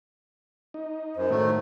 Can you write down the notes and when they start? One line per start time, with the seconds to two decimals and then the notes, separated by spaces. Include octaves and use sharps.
0.74 D#4
1.16 F#2 C5
1.30 A2 D#3 F#3 A3